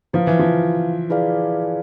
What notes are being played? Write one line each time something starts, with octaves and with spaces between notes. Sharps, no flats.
F3 E4 B4 F5
E3
F3
E4 G#4 B4 D5 F5